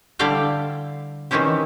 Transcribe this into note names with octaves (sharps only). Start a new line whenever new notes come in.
D3 G3 E4 D5 F5 G5
D#3 E3 C4 C#4 E4 G4